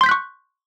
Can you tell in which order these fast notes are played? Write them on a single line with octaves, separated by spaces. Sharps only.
C6 G6 B6 F#6 C#6